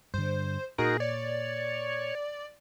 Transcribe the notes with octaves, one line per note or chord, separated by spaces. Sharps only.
G2 D3 C5
A#2 D#4 F#4 G#4 A#4
C#5 D5